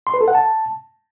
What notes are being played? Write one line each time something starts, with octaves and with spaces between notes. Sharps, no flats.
C6
B4
A4
F#5
A5